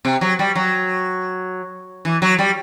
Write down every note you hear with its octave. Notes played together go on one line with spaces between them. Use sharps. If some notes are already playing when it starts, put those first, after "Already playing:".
C3
F#3
G3
F#3
E3
F#3
G3